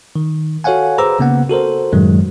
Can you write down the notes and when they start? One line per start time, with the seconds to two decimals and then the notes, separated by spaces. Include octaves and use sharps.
0.16 D#3
0.64 F#4 A4 C#5 F5 F#5 G#5
0.98 G#4 B4 C5 A#5 D6 E6
1.20 C#3 A#3 B3 F#5
1.50 F#4 A4 A#4 C5
1.93 F#2 A2 D#3 F#3 G#3